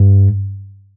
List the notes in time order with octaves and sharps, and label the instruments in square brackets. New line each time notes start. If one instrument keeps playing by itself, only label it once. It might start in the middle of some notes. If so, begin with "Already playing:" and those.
Already playing: [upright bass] G2